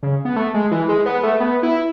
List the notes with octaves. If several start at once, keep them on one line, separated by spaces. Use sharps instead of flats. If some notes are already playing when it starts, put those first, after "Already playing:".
C#3
B3
A3
G#3
E3
G#3
B3
A3
B3
E4